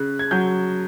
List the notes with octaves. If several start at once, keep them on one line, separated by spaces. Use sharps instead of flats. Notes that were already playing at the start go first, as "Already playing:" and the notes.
Already playing: C#3 F#6
G#6
F#3 G6